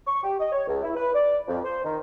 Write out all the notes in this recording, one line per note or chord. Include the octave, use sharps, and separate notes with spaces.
C#6
G4
D#5
C#5
C#2
E4
B4
D5
F2
C5
D#3